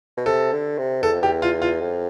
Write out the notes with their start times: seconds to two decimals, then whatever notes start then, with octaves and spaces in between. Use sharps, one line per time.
0.17 B2
0.26 C3 A4
0.52 D3
0.78 C3
1.03 E2 A4
1.12 F2
1.21 E2 G4
1.42 F4
1.62 F4
1.80 F2